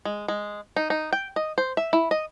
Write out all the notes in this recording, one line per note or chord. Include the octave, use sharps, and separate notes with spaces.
G#3
G#3
D#4
D#4
G5
D#5
C5
E5
E4
D#5